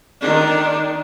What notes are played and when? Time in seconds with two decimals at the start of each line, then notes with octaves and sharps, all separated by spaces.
0.21 D#3 D4